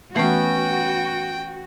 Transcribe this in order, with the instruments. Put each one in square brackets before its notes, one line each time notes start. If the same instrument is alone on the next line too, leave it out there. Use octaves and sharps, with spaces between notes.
[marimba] E3 A3 [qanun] B3 C#4 [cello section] F#4 [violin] G5